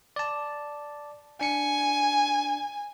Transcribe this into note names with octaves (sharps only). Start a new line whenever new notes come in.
D5 A5
D4 G#5 C#7